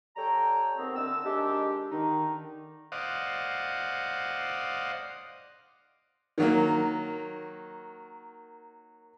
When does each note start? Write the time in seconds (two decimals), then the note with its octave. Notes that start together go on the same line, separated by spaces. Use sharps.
0.17 G3 A4 C#5 G5 A#5
0.77 G#2 D#3 B3 C4
0.96 A2 D3 A4 E6
1.25 D#3 G#3 D4 G4
1.91 D3 D#3 D#4
2.92 C5 D5 D#5 F5 F#5
6.38 D#3 F#3 A#3